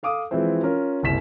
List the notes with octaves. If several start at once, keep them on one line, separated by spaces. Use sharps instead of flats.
A4 F5 D6 D#6
E3 F3 G#3 C4 E4 C5
C#4 F4 A#4
F#1 C2 E4 B6 E7